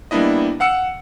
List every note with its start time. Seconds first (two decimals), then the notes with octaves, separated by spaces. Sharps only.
0.11 G3 A#3 B3 D4 E4 D#5
0.60 F5 F#5 E6 C#7